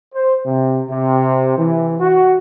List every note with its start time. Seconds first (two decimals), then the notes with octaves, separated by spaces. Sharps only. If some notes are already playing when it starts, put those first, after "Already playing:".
0.15 C5
0.46 C3
0.90 C3
1.58 E3
2.00 F#4